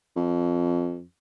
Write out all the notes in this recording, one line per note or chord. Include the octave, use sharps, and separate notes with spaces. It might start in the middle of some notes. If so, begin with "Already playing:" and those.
F2